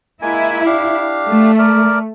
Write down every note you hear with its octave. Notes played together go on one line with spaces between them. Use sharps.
G#3 A#3 E4 G#5
D4 G4 F5
A3
A#4 D5